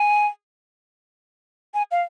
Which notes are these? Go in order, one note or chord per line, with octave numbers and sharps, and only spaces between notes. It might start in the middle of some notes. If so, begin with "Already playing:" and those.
Already playing: G#5
G#5
F5